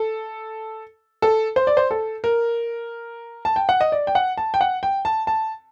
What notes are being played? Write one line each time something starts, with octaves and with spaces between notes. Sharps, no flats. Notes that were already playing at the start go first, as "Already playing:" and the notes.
Already playing: A4
A4
C5
D5
C5
A4
A#4
A5
G5
F#5
D#5
D5
G5
F#5
A5
G5
F#5
G5
A5
A5